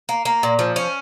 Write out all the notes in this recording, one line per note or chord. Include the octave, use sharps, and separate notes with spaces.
A#3
A#3
A#2
F3
C#4